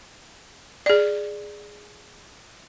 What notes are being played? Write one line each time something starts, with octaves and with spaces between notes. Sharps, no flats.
G#4 D5